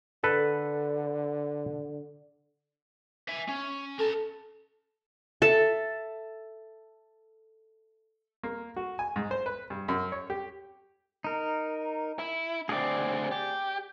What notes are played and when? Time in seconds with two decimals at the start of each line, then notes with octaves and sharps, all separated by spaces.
0.24 D3 A4 B4
3.29 E5 G#5
3.48 C#4
3.99 A4 A#4 A5
5.42 A4 E5 A5
8.43 A#3
8.76 F#4
8.99 G#5
9.16 G#2
9.31 C5
9.46 B4
9.70 G2
9.88 F#2
10.12 C#5
10.30 G4
11.24 D#4 A#4
12.19 E4
12.69 D2 C4 G#4 D5
13.31 G4